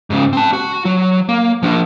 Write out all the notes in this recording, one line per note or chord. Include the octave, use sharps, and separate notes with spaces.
G#2 C#3
C4 A5
F#4
F#3
A#3
F3 D4